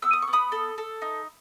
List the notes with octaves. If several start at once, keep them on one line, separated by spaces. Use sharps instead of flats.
B3 E6
D#6
C#6
B3
B5 D#6
A4
A4
D#4